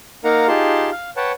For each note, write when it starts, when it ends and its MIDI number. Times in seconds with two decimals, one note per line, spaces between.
0.24 0.47 58
0.24 0.47 63
0.24 0.47 70
0.24 0.47 77
0.24 0.47 78
0.24 0.47 82
0.48 0.90 63
0.48 0.90 65
0.48 0.90 67
0.48 0.90 68
0.48 0.90 81
0.48 0.90 84
0.92 1.10 77
1.17 1.32 71
1.17 1.32 73
1.17 1.32 78
1.17 1.32 79
1.17 1.32 81